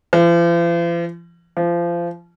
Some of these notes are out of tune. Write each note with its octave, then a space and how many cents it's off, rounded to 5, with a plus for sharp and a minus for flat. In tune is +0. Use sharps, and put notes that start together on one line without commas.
F3 -45
F3 -25